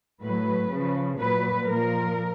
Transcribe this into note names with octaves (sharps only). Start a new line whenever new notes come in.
A2 F#3 B4
C#3 F3
A#2 F#3 B4
A#2 F3 A#4